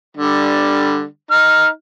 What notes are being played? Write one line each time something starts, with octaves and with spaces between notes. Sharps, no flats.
D3 G3
D#4 F6